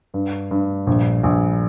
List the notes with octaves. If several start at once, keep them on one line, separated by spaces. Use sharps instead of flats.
G2
G2
A#1
A#1